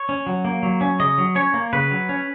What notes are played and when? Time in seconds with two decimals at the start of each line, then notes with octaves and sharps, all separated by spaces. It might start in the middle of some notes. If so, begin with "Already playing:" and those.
Already playing: C#5
0.09 C#4
0.27 F#3
0.45 A#3
0.63 F#3
0.81 C#4
1.00 C#3 D#5
1.18 F#3
1.35 C#4 C#5
1.54 A#3
1.73 C#3 B4
1.91 F#3
2.09 C#4